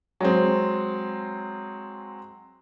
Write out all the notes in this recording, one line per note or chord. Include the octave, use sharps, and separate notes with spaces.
F#3 G#3 C4